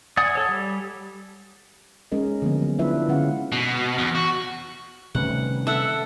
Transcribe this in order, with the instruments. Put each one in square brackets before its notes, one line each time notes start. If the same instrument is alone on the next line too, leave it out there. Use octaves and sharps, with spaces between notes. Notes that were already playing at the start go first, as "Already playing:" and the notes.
[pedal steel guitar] D5 F#5 G#5 D#6
A4 C#5
G3
[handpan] G#3 C#4 A#4 D#5
D3 F3 A#3 B3
F#3 B3
D4 E4 F4 B4 E5
D3 G#3 C#4 F5 F#5
[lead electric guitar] B2
E2
F#4
[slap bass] C3 D#3 G3 [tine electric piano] A3 C#4 B4 [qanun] F#5
[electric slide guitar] A4 A5 [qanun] E5 F#5